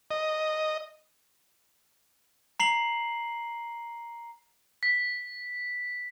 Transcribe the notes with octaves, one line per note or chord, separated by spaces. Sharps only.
D#5
A#5 C7 F#7
B6